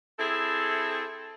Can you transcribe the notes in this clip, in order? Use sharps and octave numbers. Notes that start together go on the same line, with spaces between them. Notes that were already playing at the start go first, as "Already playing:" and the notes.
C4 E4 G#4 A4